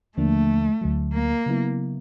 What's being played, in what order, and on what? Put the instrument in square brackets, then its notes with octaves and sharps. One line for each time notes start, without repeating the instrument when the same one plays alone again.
[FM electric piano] D#2 D3 F3 A#3 D4 [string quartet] A3
[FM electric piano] D2 D3 F#3
[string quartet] A#3
[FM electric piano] C#3 F#3 B3 E4